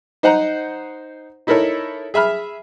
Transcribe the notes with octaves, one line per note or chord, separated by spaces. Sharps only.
D#4 C5 D#5 F#5 A#5
D#4 E4 A4 A#4 C#5
G#4 E5 B5 F6